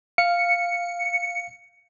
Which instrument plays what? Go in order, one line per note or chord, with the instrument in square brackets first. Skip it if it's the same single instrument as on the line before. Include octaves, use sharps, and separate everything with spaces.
[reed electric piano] F5 [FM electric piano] C#7